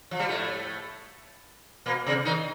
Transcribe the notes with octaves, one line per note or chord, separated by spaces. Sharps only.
F3
G3
A2 A3
A#2 A#3
C3 C4
D#3 D#4